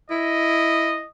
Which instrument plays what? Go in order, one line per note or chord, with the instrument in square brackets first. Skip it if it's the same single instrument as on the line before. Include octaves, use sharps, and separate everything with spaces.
[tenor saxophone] E4 [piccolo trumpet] D#5